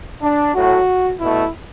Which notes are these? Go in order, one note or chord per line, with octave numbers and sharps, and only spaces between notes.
D4
A2 F#3 A3 F#4
B2 A3 E4